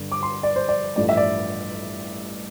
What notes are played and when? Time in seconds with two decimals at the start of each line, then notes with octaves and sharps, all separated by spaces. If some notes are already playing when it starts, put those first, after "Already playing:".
Already playing: G2 D3
0.12 D6
0.23 C6
0.43 D5
0.56 C5
0.68 D5
0.96 A1 G2 F3 A3 D5
1.09 E5
1.17 D5